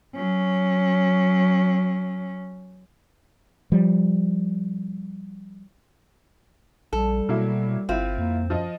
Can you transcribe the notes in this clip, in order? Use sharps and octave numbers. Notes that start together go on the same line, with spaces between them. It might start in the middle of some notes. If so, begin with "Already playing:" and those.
F#3 C#4
F3 G3
A#1 G3 A4
B2 F#3 A#3 E4
G1 C4 E4 F4
F2 A#3
F#2 F3 D#5